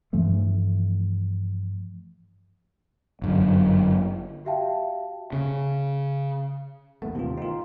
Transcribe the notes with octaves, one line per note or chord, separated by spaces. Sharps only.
G2 E3 F3 A3
G1 F#2 D3
F#4 G4 E5 F5 G5 A5
C#3
E1 A#1 A3 B3
A1 D#2 C3 D#3 F4
D#3 D#4 F4